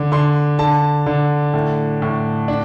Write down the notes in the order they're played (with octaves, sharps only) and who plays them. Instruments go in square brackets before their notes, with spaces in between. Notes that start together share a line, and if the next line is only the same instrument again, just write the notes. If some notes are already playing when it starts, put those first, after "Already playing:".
Already playing: [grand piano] D3
D3 C6
D3 A5
D3
A2
A2
D4